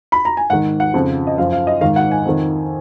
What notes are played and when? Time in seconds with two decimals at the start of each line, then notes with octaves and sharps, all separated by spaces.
0.12 B5
0.25 A#5
0.37 G#5
0.50 G#2 D#3 F#5
0.80 F#5
0.93 F2 C#3 F3
1.27 D#5
1.37 F#2 F3 F5
1.53 F5
1.67 D#5
1.81 G#2 D#3 F5
1.96 F#5
2.11 G#5
2.25 F2 D#3